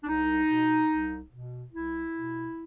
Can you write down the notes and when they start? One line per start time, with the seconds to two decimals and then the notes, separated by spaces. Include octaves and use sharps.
0.04 D4
0.08 C2 D#4
0.49 B2
0.90 C2
1.31 B2
1.72 C2 E4
2.13 B2